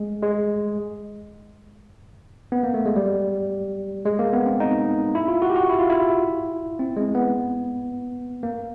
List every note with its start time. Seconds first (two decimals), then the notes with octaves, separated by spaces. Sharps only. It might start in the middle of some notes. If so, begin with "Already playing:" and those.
Already playing: G#3
0.22 G#3
2.52 B3
2.63 A#3
2.74 A3
2.86 G#3
2.96 G3
4.05 G#3
4.19 A#3
4.33 B3
4.46 C4
4.60 D#4
5.15 E4
5.28 F4
5.42 F#4
5.50 G4
5.56 F#4
5.69 E4
5.79 F4
5.90 E4
6.79 C4
6.97 G#3
7.15 B3
8.43 A#3